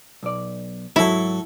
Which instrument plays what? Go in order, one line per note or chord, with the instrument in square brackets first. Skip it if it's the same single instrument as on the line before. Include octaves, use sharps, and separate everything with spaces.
[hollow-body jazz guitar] B1 D5
[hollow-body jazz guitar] G#2 F#3 [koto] E4 [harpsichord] F#4 A4